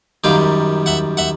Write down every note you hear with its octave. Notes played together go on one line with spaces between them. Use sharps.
F#2 D#3 G3 F5 G5
E5 F#5
E5 F#5